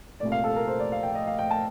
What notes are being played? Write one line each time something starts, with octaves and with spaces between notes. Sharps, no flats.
C2 A#2 A3 D5
F5
A4
A#4
C5
D5
F5
G5
D#5
F5
G5
A5